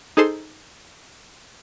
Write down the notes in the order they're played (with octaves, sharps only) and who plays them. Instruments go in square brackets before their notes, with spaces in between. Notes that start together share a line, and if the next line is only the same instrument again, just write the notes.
[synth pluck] D#4 G#4 A4 C5 C6